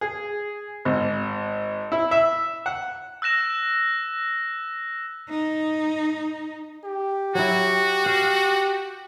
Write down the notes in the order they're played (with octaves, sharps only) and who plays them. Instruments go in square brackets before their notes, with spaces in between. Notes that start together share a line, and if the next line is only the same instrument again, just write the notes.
[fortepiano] G#4
G#1
E4
E5
F#5
[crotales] E6 F#6 A#6 E7
[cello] D#4
[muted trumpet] G4
[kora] F#3 E4 [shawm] F#4
[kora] F5